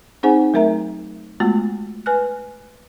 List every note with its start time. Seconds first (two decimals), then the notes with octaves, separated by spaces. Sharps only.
0.23 C4 D#4 G#4 C5 F#5 G#5
0.54 F#3 A3 A#4 E5 A#5
1.40 G#3 A3 B3 F4 F#4
2.06 B4 G#5 F6 F#6